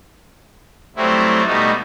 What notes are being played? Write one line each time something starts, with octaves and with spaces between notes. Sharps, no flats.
F#3 G3 A3 C4 E4
B2 G3 A3 B3 D#4